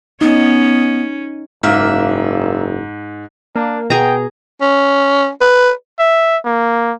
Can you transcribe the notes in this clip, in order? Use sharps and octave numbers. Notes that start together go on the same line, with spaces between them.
B3 C#4 D#4
F#1 G#2 A#3 A#4 E5
A#3 D4
B2 G#4 G5 A#5
C#4
B4
E5
A#3